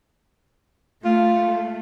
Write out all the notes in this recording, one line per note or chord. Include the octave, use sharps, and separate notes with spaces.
A3 F4